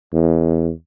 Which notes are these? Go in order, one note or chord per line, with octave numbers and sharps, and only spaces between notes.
E2